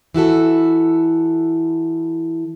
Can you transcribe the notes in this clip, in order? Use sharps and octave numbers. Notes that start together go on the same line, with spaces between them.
E3 E4 F#4 A4